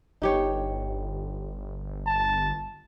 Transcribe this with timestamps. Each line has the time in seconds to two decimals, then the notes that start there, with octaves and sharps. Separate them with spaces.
0.22 G1 D#4 G4 C#5
2.06 A5